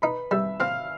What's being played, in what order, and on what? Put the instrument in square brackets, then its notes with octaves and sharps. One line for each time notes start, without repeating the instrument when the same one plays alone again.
[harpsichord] D#4 [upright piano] B4 B5
[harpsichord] G3 [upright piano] E5 E6
[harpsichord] C4 [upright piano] F5 F6